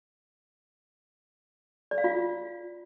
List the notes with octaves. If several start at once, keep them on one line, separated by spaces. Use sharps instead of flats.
D5
F5
F4